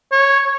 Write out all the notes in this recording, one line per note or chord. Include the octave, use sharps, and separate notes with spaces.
C#5